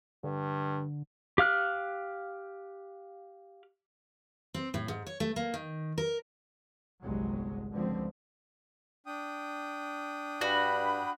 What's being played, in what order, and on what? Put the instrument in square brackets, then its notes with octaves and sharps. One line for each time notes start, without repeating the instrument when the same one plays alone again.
[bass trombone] G2 [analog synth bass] D3
[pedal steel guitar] G4 F5 F6 F#6
[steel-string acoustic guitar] C4
A2
G#2
C#5
A3
A#3
D#3
A#4
[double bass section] G1 C2 F#3 G#3
C#2 D3 F3 C4
[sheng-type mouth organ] D4 G5 D#6
[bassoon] G2 [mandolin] F#4 [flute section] B5